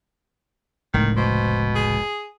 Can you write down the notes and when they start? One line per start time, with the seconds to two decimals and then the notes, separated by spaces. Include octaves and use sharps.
0.94 F1 C#2 A2 D#3
1.17 B2 C5
1.75 G#4